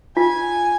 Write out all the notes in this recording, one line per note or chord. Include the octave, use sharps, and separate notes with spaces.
F4 G#5